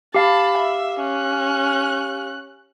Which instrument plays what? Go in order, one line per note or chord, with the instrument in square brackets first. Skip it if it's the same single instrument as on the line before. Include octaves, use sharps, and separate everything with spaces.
[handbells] G4 F5 [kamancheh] A5 B5
[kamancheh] E5
C#4 F#6